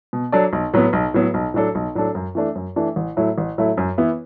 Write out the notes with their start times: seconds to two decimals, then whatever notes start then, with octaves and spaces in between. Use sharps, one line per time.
0.13 B2
0.32 F#3 D4 A4 D5
0.53 B1
0.74 A2 F#3 B3
0.93 B1
1.14 A2 F#3 B3
1.34 B1
1.54 A2 F#3 D4 A4
1.75 B1
1.95 A2 F#3 D4 A4
2.15 F#2
2.35 E3 A3 D4
2.55 F#2
2.76 E3 A3 D4
2.96 A1
3.17 A2 F#3 A3 E4
3.38 A1
3.58 A2 F#3 A3 E4
3.77 F#2
3.98 E3 B3 E4